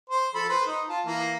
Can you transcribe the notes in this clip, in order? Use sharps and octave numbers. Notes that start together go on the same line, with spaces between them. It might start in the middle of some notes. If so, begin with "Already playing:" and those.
C5
F3 A4 B5
B4 C5 B5
D#4
F4 A5
E3 A#3